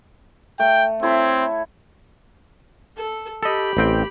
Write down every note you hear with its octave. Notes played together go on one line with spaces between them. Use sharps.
A3 G5
C4 E4 A4 C#5
A4
G4 A4 D#5 B5
A1 C4 G5